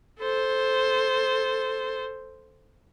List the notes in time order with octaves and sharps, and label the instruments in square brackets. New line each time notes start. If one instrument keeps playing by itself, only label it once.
[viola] A4 C5